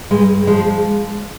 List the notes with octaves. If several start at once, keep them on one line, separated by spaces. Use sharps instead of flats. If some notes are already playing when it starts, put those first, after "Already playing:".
G2 G#3
F3 G#3